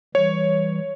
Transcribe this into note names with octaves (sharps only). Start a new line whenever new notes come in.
E3 G3 C#5